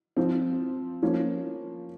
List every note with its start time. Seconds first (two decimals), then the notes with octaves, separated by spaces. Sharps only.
0.17 F3 C4
1.02 F3 A#3 C#4